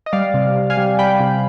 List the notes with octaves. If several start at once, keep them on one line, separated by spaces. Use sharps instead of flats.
D#5
G3 D5 F5
C3
C3
F5 G#5
G3
G3 G5 B5
C3